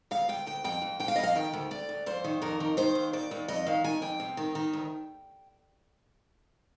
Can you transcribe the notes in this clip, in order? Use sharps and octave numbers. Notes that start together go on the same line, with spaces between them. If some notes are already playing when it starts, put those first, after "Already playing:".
D2 F5
D2 G5
D2 G5
F2 G5
F2
F2 G5
F5
F2 D#5
F5
D#3 G5
D2
D2 D5
D2
F2 C5
D#3
F2 A#4
D#3
D#3 C5
D#2
D#2 D5
D#2
F2 D#5
D#3 F5
D#3 G#5
F2 G5
C3
D#3
D#3
D2